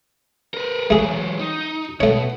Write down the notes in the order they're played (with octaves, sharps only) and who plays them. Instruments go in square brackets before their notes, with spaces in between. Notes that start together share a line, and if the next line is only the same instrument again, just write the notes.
[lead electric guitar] A#4 B4
[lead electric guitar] E3 F#3 [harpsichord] A3 G#4
[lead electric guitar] D#4
[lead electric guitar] B2 [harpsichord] A3 C#5